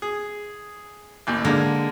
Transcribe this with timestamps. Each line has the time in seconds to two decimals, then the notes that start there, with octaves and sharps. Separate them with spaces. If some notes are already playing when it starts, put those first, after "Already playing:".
0.02 G#4
1.27 A1 D#2
1.45 D3 G#3 A#3 D4